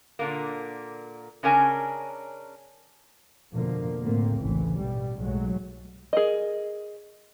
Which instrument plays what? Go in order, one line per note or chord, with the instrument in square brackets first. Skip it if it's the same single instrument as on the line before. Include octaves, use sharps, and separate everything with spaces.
[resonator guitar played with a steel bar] A#2 D3 A#3
C#3 C#4 D4 A#4 G#5
[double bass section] F2 B2 D3 F3 A#3
A2 D3 A3 A#3 C4
A1 D2 C#3 E3
G2 B2 G3
B1 F#3 G#3 A3
[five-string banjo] G#4 A#4 D#5